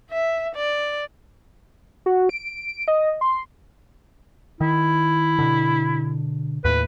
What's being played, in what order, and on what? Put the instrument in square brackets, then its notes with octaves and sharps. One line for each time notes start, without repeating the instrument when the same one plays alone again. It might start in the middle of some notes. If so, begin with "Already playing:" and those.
[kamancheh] E5
D5
[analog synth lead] F#4
D7
D#5
C6
[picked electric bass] D#3 [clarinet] E4
[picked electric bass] B2 D3
[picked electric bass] D#2 A2 [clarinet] B4